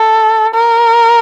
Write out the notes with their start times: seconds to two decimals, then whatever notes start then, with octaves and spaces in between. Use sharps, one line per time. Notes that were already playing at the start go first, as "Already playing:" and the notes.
Already playing: A4
0.54 A#4